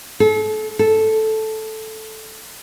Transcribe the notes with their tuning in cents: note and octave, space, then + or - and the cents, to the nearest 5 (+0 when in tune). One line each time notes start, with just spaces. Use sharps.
A4 -35
A4 -5